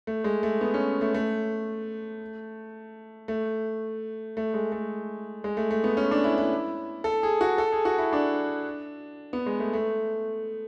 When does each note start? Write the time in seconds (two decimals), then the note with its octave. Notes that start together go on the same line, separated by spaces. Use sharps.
0.07 A3
0.24 G#3
0.43 A3
0.61 B3
0.74 C#4
1.01 A3
1.14 A3
3.28 A3
4.37 A3
4.54 G#3
4.72 A3
5.44 G#3
5.57 A3
5.71 A3
5.84 B3
5.97 C#4
6.11 D4
6.24 E4
6.38 E4
7.04 A4
7.23 G#4
7.41 F#4
7.58 A4
7.72 G#4
7.85 F#4
7.98 E4
8.13 D4
9.33 B3
9.46 G#3
9.60 A3
9.73 A3